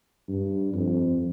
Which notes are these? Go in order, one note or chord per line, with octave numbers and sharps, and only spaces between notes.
G2
F2